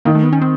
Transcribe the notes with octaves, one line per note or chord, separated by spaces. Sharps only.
D#3 A#3
A3
B3
C#4
C4